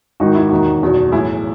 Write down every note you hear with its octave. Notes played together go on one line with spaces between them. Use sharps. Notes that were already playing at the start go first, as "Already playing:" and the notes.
G#1 G#2 D#3 D#4 F#4
E4
E1 D#2 D#3 D#4 F#4
F#1 E2 B2
B1 A2 E3 E4 G#4